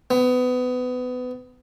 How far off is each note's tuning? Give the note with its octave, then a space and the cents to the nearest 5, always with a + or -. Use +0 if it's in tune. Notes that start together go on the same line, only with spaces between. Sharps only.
B3 +25